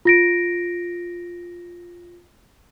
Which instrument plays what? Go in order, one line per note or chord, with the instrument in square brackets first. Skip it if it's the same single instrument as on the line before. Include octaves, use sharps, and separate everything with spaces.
[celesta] F4 A#6 D7